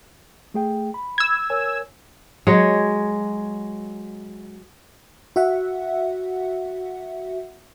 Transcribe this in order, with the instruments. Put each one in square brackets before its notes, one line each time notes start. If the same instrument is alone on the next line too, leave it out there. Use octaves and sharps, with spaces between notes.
[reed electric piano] A3 G#4 G5
B5
[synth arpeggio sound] E6 G#6
[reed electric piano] A#4 C#5 G#5
[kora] F#3 G#3 C#5
[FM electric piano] F#4 E5 F#5